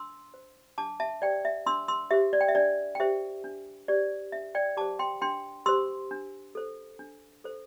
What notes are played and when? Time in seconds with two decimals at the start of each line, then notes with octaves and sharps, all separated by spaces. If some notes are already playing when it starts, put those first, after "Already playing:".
Already playing: D4 C6 E6
0.34 C5
0.78 D4 A5 D6
1.00 E5 A5
1.22 G4 C5 D5 G5
1.45 E5
1.66 D4 C6 E6
1.88 C6 E6
2.11 G4 C5 E5
2.33 D5
2.41 G5
2.48 E5
2.55 D4 D5
2.95 G5
3.00 G4 C5 E5
3.44 D4
3.88 G4 C5 D5
4.32 D4 E5
4.55 D5 G5
4.77 G4 C5 A5 D6
4.99 G5 C6
5.22 D4 G5 C6
5.66 G4 C5 C6 E6
6.11 D4
6.55 A4 C5
6.99 D4
7.44 A4 C5